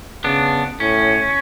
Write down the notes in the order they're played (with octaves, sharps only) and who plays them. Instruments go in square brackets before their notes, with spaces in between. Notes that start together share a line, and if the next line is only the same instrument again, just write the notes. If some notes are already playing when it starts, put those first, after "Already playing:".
[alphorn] C#3 [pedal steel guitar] B3 D4
[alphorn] A2 [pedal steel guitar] C#4